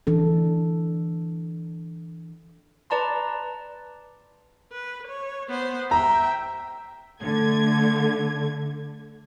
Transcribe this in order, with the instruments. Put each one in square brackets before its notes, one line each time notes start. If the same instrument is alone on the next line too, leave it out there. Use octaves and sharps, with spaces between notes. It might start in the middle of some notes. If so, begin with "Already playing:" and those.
[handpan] E3 D4 A4
[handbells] B4 D5 A5 A#5 C6
[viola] B4
C#5
B3 C5
[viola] E5 G5 [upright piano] A#5
[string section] D3 A3 G#6